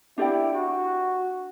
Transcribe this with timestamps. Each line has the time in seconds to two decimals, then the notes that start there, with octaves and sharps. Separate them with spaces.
0.18 D4 E4 G4 D5 G5
0.54 F#4